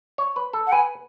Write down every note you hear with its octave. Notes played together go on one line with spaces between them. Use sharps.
C#5
B4
A4
F#5
B4 G#5